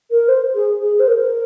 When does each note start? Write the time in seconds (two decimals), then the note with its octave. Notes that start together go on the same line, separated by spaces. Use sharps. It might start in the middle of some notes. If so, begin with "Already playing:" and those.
0.11 A#4
0.28 C5
0.55 G#4
0.81 G#4
0.99 C5
1.08 A#4